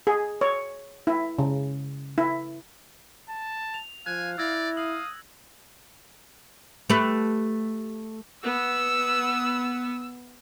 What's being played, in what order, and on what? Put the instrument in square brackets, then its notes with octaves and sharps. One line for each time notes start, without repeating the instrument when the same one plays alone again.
[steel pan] G#4
C#5
E4
C#3
E4
[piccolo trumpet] A5
[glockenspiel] F7
[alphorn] F3 [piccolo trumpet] F5 [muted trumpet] G#5 [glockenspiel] F#6
[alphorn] E4 [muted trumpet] D5 [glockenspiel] E6 G#6 A#6
[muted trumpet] F5 [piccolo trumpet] D#6 [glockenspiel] F#7
[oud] A3 G4 B4
[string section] B3 [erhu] E6